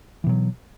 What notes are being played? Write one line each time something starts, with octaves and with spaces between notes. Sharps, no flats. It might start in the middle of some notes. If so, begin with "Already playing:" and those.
B2 E3 F#3